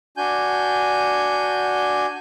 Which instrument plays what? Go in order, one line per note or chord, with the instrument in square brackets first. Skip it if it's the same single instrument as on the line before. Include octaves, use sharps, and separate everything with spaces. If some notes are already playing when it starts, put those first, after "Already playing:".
[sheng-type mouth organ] D4 F#4 G#5 G6